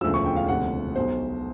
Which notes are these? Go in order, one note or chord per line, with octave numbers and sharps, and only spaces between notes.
E1 D2 C#3 F3 E6
C#6
G5
F5
E1 D2 C3 F3 F#5
B1 B2 C5